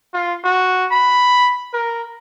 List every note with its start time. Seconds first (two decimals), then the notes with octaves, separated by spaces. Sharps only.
0.13 F4
0.44 F#4
0.91 B5
1.73 A#4